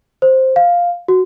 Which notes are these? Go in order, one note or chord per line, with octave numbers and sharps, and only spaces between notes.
C5
F5
F#4